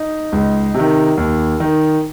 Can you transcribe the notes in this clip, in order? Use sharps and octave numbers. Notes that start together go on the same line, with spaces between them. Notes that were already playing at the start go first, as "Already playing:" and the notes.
Already playing: D#4
C#2
C3
D#3
D#2
D#3